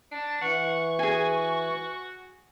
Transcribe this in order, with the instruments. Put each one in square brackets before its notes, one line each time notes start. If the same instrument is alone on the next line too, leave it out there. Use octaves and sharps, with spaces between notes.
[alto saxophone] D4 [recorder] A5
[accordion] E3 [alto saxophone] F#5 [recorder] C#6
[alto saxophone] F#4 [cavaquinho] G#4 G#5